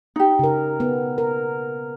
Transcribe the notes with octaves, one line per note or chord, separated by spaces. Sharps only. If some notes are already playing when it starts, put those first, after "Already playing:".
D#4 G4
C#3 A#4
B3
A#4